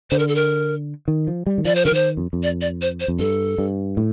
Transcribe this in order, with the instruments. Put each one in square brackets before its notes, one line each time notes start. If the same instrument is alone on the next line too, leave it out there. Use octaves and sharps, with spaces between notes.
[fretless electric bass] D3 [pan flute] C5
[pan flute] A#4
A4
A#4
[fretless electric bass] D#3
F3
G3
D#3
[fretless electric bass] F3 [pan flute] D5
[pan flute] C5
[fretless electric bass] D3 [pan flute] A#4
[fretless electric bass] D#3 [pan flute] C5
[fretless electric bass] F2
F2
[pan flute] D5
D5
C5
C5
[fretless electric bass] F2
[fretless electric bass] G2 [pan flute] A4
[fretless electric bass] G2
A2